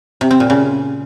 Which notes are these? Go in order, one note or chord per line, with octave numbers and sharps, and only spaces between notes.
C3
C4
A#2
C#3